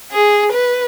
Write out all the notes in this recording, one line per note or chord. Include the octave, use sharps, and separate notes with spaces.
G#4
B4